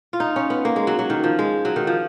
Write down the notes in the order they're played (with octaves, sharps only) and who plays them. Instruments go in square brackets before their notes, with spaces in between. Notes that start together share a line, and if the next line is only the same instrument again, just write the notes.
[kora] F4
D#4
C#4
B3
A#3
G#3
F#3
F#3
D#3
F3
G#3
F#3
D#3
F3